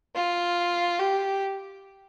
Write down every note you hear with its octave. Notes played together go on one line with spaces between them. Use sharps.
F4
G4